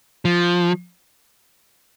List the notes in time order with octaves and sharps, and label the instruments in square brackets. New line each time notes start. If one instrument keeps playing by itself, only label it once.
[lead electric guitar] F3